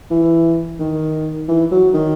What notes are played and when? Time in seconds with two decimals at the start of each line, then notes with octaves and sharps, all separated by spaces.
0.11 E3
0.80 D#3
1.49 E3
1.72 F#3
1.94 D#3